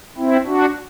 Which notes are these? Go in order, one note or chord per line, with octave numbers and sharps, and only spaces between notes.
C4 E4
D4 F#4